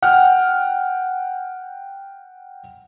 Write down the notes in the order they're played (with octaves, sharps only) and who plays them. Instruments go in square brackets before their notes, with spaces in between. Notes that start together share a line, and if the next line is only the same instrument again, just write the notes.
[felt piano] F#5 G5 F6